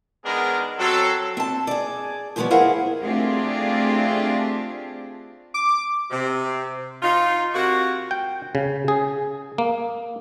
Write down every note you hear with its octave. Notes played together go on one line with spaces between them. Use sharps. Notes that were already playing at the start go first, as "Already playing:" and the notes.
D#3 G#3 B3 D4 G#4 A#4
F#3 C4 A4
C4 A5
G#4 D5
G#2 D#3 F3 G3 B3 C#5
E4 G#4 A#4 C5 F5 F#5
A3 C4 D4 F4 G4 G#4
D6
C3
D#4 F4
C3 A#3 F#4
G5
C#3
G#4
A#3